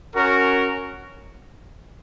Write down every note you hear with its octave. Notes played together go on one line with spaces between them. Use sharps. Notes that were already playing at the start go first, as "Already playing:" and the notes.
C#4 F#4 A#4